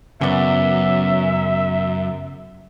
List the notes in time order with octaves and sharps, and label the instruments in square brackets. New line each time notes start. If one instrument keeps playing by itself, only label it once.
[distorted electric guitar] F#2 [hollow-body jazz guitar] C#3 B3 [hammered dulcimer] D5 F#5 [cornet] E5